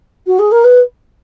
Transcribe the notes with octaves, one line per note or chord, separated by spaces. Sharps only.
F#4
G#4
A#4
B4